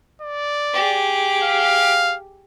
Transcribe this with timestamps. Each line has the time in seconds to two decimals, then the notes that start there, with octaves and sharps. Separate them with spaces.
0.22 D5
0.74 G4 G#4
1.44 F5